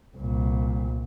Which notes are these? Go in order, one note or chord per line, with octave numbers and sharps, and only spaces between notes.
C2 A#2